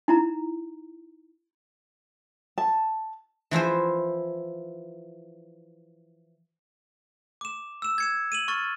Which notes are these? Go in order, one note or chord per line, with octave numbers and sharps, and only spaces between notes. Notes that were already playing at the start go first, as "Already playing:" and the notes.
D#4 E4 A#5
A5
E3 F3 E4 C5
D6 E7
E6 E7
G#6 C#7 E7
D#7 E7 F#7
C#6 F6 A6